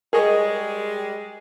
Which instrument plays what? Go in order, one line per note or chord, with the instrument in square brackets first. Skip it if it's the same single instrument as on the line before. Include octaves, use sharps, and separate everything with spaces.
[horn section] G3 G#3 [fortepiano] G#4 C#5 D#5 [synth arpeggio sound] A#4